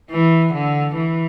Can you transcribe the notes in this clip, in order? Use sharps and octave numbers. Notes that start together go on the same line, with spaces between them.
E3
D3
E3